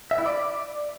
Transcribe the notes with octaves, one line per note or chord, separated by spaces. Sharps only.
E5
E4
D5